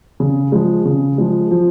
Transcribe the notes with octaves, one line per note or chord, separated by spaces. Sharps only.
C#3
F3 G#3
C#3
F3 G#3
F3